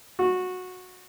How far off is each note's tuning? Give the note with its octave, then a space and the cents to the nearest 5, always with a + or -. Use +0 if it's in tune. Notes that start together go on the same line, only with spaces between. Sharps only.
F#4 -15